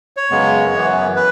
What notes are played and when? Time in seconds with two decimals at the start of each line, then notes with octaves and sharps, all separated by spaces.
0.17 C#5
0.31 F#2 C#3 G#3 B3
0.73 F#2 E3 B3
1.16 B4